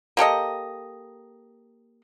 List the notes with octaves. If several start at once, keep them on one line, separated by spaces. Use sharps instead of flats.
A#3 G4 A4 D#5